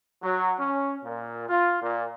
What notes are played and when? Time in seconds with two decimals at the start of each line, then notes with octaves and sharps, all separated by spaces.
0.23 F#3
0.58 C#4
1.04 A#2
1.49 F4
1.82 A#2